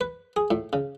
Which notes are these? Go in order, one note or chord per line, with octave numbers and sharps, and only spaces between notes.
B4
G#4
A2
C#3